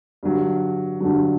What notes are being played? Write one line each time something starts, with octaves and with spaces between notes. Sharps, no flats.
G2 D3 F#3
G2 D3 F#3